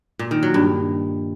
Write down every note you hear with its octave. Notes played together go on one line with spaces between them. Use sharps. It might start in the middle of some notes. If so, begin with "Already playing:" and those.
A#2
D#3
F#3
G2